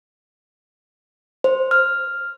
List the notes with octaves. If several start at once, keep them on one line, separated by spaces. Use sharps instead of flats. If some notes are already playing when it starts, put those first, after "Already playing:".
C5
F6